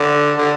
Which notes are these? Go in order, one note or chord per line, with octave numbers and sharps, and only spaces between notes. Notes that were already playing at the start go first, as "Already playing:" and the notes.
Already playing: D3
D3